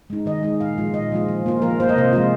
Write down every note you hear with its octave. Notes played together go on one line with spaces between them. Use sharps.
G#3 D#4
D#3 D#5
G#3 D#4
A#2 F5
F3 G#3 F4
A#2 D#5
F3 G#3 F4
F3
A#3 F4
F3 A#4
A#3 F4 C5
D#5
C3 C5
F3 G#3 F4